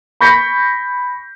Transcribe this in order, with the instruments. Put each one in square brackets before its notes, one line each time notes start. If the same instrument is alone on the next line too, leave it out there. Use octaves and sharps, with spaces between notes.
[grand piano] B5 C#6 G6 A#6 B6 C#7